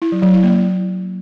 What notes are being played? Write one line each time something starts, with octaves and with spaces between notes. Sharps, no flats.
E4
F#3
F#3
E4
A#3